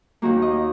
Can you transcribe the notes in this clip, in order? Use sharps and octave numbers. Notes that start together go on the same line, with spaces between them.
D#2 D#3 A#3 F#4
D#5